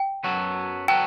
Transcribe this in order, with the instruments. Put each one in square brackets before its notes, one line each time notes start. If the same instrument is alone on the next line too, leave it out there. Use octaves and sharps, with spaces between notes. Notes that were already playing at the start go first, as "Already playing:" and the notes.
Already playing: [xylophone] G5
[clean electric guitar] F#2 F#3 B3 F#4 A4
[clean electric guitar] F#3 B3 F#4 A4 [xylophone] G5